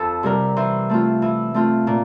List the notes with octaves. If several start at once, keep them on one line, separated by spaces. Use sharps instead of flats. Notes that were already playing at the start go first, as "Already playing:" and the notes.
Already playing: F2 A4 C5
C3 G3 A#4
E3 C5
A3 C4 F4
E3
A3 C4 F4
A#2